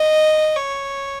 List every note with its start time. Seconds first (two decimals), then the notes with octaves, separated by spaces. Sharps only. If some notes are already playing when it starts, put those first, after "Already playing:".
Already playing: D#5
0.56 C#5